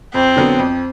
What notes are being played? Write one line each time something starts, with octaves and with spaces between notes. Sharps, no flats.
F2 C4
D3 F#3 B3
F2